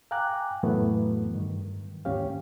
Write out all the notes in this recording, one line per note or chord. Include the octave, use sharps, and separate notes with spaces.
F5 G5 G#5 A#5 D6 F#6
F2 A2 E3 F#3 A3 B3
G2 D#3
D#2 G#2 C#4 G4 F5